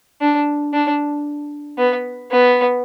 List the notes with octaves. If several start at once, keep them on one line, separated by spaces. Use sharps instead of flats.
D4
D4
B3
B3